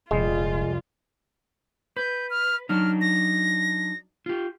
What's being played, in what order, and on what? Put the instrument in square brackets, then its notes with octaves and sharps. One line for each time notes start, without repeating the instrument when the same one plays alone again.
[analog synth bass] D#1 [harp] C2 F2 [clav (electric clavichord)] G#3 [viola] F4
[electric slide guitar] B4 [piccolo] G6
[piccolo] F6
[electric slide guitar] F#3 D4 D#4 [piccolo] F6
[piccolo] A#6
[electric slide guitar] F4 G4